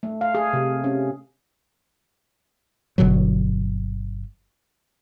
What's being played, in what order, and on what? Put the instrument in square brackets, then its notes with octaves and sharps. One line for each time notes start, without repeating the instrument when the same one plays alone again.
[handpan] A3
F5
G#4
C3
C#4
[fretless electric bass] G1 B2 D3 F#3